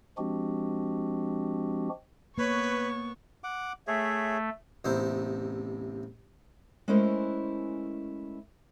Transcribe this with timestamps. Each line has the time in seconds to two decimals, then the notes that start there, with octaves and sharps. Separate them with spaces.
0.18 F3 G#3 C4 D4 F#4 G4
2.38 A#3 B3 B4 C#5 C#6
3.44 F#5 D6
3.88 A3 G#4 C#5 E5
4.85 A1 E2 C3 D#4 E4 C5
6.88 G#3 A3 C#4 E4 A#4 C5